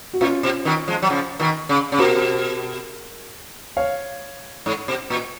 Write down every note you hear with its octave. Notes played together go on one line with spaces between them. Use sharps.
F#4
A#2 C#4 F4
B2
B2 D#3
F3 G#3
F#3
C#3 F3
B2 D#3
C#3
C#3
B2 F#4 A#4
C#5 F5
G#2
B2
A#2